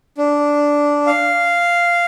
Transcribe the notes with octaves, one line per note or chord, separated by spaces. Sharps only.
D4
F5